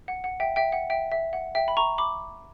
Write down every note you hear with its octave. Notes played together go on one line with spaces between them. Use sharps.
F#5
F#5
E5 G5
E5 G5
F#5
E5 G5
E5
F#5
E5 G5
B5
A#5 C#6
B5 D6